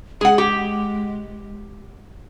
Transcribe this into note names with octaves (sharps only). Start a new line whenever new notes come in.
G#3 G#4 F#5
G4